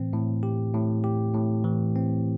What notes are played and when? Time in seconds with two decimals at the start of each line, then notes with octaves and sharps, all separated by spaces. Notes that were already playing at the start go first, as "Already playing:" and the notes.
Already playing: A2 E3 C4
0.13 A2
0.43 G4
0.74 A2
1.04 G4
1.34 A2
1.64 E3
1.96 C4